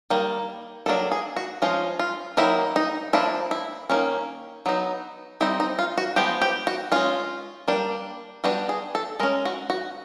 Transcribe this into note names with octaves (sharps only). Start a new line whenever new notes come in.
D#3 G3 A#3
D#3 F#3 A#3 D4 A4
G#4
F#4
F3 G#3 C#4 F4
F4
D#3 F#3 A#3 D#4 E4
D#4
F3 A#3 D4 E4
E4
D#3 F#3 A#3 C#4
F#3 B3 D#4
G3 C4 D#4 E4
D#4
F4
F#4
F3 G#3 B3 G4
G4
F#4
G#3 C#4 F4
G3 A#3 D4
G3 B3 D4 F#4
G#4
A4
G#3 C#4 A#4
F#4
F#4